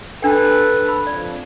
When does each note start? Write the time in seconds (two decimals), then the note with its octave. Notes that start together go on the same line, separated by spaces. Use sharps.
0.22 D4 A4 B4 G5
0.89 B5
1.07 F2 D5